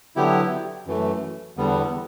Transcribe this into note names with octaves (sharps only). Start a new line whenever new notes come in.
D3 F#3 B3 E4 G4
F#2 E3 A3
E2 D3 G3 B3